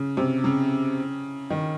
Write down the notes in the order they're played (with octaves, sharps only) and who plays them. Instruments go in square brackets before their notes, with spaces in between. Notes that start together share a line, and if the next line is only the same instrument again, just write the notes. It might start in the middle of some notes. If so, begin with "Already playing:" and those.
Already playing: [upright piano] C#3
C3
C#3
D#3